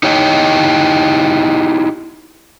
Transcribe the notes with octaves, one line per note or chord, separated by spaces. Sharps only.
D#4 E4 G4 C#5 D#5 G5